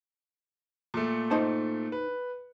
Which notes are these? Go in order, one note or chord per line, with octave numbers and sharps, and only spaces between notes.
A#2 A3
D#4 C5 A5
B4